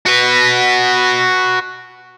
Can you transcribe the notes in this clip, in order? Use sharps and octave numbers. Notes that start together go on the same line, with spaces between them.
F#4 B4